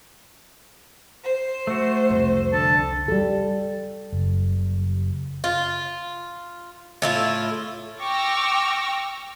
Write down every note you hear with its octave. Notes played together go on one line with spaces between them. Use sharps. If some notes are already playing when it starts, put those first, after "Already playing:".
C5
A3 F#4
C2 F2
D3 A4
G3 A4
F#1
F4
A2 E4 F4
G5 C#6 D6 E6 F6 A#6